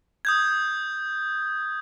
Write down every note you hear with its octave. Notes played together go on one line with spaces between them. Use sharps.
D#6 G6 G#6